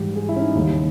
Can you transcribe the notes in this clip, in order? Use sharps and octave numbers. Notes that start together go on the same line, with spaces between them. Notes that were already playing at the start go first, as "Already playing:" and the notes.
Already playing: G#2 E3 G3 G4
G#4
E4
C#4
D#4
D#2 C#3 G3